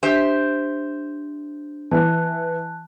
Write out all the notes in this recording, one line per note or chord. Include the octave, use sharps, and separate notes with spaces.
D4 G4 C5 E5
E3 A5 F#6